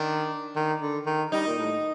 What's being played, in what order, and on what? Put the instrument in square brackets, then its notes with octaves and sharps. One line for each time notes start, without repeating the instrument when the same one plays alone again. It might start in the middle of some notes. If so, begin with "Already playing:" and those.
Already playing: [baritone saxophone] D#3 [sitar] D4
[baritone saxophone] D#3
D3
D#3
[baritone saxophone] G3 [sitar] D#4
[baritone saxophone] A#2
A2